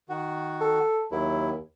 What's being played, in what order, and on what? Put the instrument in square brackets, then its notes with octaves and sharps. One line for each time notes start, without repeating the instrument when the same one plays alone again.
[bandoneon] D#3 F#4
[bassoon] A4
[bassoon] D#2 [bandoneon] F#3 E4